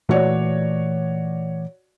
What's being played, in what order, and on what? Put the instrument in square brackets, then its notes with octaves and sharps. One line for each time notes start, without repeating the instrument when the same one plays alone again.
[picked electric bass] A#2 E3 A3 [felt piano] F#4 C#5 D5